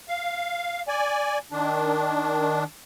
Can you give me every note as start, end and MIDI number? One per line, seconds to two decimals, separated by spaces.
0.09 0.82 77
0.88 1.38 74
0.88 1.38 80
1.52 2.64 51
1.52 2.64 62